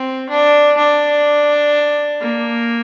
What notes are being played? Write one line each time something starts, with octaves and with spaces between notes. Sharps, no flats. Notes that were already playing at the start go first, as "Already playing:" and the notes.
Already playing: C4
D4
D4
A#3